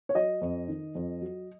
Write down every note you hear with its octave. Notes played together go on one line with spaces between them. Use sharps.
C#5
F#3 D#5
F2
D#3
F2
F#3